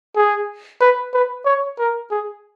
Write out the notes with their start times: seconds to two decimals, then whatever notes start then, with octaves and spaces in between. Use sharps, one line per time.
0.16 G#4
0.81 B4
1.14 B4
1.45 C#5
1.79 A#4
2.11 G#4